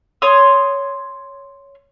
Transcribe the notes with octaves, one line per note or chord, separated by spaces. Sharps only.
C#5 C6 D#6